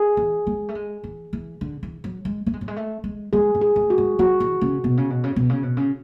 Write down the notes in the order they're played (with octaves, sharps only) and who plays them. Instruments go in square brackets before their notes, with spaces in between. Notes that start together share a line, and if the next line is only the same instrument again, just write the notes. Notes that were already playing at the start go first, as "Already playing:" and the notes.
Already playing: [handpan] G#4
[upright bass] E3
G#3
A3
G#3
E3
E3
D3
E3
F#3
G#3
A3
G#3
F#3
G#3
A3
G#3
[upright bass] G#3 [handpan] G#4
[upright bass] G#3
[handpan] G#4
[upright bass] A3
[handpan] F#4
[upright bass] G#3
[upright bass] F#3 [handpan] F#4
[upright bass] E3
C#3
B2
C#3
B2
C#3
B2
C#3
B2
C#3